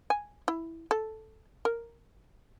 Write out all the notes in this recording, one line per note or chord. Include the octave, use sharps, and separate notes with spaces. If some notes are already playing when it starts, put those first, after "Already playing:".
G#5
E4
A4
A#4